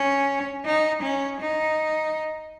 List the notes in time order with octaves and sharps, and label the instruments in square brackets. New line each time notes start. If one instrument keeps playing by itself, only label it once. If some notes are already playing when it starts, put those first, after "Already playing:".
Already playing: [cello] C#4
D#4
C#4
D#4